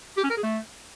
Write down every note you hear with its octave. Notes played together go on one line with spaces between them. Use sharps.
G4
C#4
A#4
G#4
A3